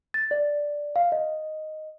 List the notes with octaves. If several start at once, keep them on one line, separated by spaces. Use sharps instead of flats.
A6
D5
F5
D#5